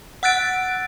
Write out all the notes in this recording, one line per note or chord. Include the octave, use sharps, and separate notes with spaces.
F#5 E6 F#6 A6 D7